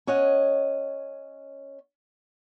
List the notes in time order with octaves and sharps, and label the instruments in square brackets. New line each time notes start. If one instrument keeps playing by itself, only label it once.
[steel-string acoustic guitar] C#4 C#5 D#5 F#5